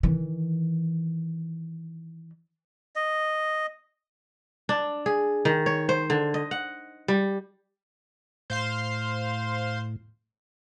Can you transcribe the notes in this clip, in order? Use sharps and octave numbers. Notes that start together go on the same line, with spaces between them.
D#3 E3
D#5
D4
G#4
D#3
C#5
C5
D3
D#5
F#5
G3
A2 C5 F5 C6